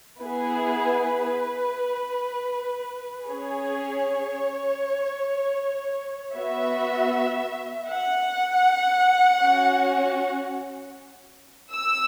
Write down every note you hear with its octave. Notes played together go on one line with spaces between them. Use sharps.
B3 E4 G#4 B4
C#4 G#4 C#5
B3 F#4 E5
F#5
C#4 F#4
E6